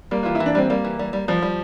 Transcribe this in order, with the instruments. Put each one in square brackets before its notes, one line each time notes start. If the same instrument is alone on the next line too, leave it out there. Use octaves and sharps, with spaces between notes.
[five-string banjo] G3 [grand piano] A#3
[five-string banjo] E3 [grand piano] F4
[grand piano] E4
[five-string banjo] E3
[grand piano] D4
[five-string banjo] G3 [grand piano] C4
[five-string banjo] G3 [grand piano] A#3
[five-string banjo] E3
G3
G3
[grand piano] F3 [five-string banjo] G3
[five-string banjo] G3